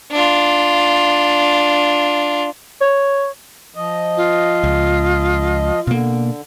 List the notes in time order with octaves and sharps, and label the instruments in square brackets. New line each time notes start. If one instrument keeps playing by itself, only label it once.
[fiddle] D4 F4
[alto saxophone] C#5
[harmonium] F3 D#5
[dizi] F4
[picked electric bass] C#2
[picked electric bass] B2 A#3 [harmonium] D3